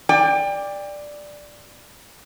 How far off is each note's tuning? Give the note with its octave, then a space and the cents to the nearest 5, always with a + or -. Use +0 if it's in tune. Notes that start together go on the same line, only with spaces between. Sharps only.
D5 +0 G5 +30